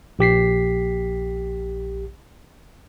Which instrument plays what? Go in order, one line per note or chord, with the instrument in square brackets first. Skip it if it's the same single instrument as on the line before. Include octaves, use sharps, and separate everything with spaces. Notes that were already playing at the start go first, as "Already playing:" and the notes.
[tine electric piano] A#1 G4 B6 C7